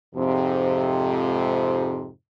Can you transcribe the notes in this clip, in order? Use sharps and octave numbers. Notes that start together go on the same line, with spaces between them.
F2 G#2 C3